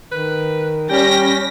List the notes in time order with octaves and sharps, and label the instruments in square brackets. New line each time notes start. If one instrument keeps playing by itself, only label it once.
[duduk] D#3 [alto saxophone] B4
[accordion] G3 C#4 [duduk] G4 [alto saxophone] G5 [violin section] A#6 B6